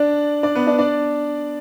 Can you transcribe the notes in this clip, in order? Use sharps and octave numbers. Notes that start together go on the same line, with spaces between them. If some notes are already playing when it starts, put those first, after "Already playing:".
Already playing: D4 D5
D4 D5
B3 B4
D4 D5
D4 D5